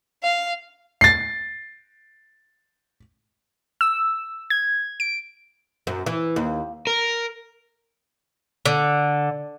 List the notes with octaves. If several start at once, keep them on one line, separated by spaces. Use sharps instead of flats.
F5
A6 C7
E6
G#6
D7
F#2
E3
D#2
A#4
D3